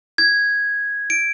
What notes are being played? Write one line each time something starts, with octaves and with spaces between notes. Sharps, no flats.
G#6
D7